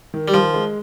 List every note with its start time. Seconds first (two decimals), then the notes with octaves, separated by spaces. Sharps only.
0.14 D#3
0.28 G3
0.34 D#3 F3
0.54 G#3